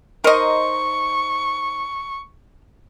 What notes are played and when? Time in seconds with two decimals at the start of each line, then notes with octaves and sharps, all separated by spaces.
0.24 D#4 A#4 C5 D#5 C6 C#6